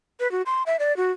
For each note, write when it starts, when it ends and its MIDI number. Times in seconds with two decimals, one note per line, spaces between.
0.20 0.30 71
0.32 0.42 66
0.46 0.63 84
0.66 0.76 76
0.79 0.96 74
0.97 1.11 66